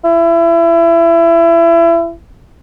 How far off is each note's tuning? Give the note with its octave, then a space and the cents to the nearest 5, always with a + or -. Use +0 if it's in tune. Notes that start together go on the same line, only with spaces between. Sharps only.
E4 +30